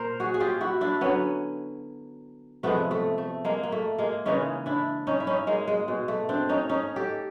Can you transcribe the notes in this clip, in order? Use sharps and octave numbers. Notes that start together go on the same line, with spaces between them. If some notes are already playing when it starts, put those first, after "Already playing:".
Already playing: A#2 A#4 C5
F#4 G#4
G#4
F4 G4
E4 F#4
D4 E4
D3 F#3 B3 C#4
C3 F3 G#3 A3 B3
A3
A3
G#3 A#3
A#3
A3
G#3 A#3
C#3 E3 G#3 C#4 D#4
D4 E4
C#4 D#4
E4
C#4 D#4
G#3 A#3
G#3
B2 G#3
A3
C4 D4
C#4 D#4
C#4 D#4
G4 A4